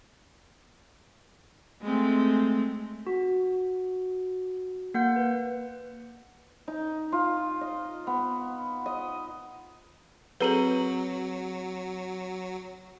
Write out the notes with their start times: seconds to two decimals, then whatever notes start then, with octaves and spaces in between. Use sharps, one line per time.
1.82 G#3 A3 C4
3.07 F#4
4.94 A#3 F#5 G6
5.16 B4
6.68 D#4
7.12 F4
7.61 D#5
8.07 B3
8.86 D#5
10.40 F#3 C4 G#4 A4 B4 A#5 F#7